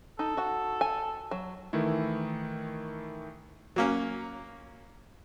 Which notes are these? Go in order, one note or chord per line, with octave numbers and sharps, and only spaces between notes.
D#4 A4
F#4 F#5
G#5
F#3
D#3 E3 A3 E4
F#3 A#3 C#4